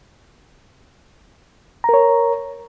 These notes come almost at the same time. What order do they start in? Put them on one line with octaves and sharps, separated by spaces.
A#5 A#4 C#5